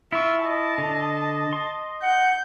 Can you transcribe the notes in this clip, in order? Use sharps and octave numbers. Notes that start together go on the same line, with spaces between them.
E4 F4 E5 C#6
D#5 A5
D3
C6
F#5 G6